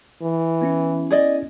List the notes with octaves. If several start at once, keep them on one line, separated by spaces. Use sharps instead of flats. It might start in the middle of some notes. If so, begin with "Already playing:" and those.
E3
B3 C#4 E4
G#4 D5 D#5